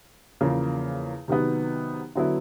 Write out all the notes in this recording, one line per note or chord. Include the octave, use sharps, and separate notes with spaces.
E2 C#3 F3 A#3
C3 D#3 F#3 B3
D3 F#3 B3 E4